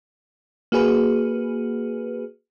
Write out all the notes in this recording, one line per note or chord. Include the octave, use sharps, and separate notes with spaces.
A#3 F#4 G#4 B4